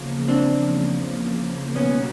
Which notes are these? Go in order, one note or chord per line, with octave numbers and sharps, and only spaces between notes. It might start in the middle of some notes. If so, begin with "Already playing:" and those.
Already playing: E2 C#3 F3 A#3
C4 D4
B2 G3 A#3 B3 C#4 D#4 F#4